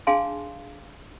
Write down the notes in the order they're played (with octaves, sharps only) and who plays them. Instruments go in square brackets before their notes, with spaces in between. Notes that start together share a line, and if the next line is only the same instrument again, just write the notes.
[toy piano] D4 G#4 F5 G#5 A5 C6